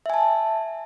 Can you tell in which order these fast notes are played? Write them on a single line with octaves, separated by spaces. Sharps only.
E5 G#5 A5